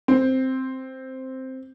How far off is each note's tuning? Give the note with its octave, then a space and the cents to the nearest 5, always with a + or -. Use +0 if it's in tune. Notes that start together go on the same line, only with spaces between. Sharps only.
C4 +0